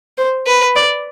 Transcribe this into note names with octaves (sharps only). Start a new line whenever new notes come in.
C5
B4
D5